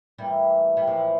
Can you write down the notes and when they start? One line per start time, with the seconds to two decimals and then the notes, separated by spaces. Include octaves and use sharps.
0.18 A2 E3 G3 A#3 E4
0.77 G3
0.87 A2 E3 F3 A#3 E4